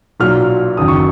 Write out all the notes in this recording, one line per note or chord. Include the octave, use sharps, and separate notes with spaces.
B1 A#2 F#3 F6
F#1 F#2 D#3 D#6
C#6